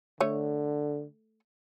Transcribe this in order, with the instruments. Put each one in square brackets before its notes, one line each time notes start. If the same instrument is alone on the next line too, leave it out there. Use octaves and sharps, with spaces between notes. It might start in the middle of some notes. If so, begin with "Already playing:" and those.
[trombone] D3 [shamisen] A3 C#5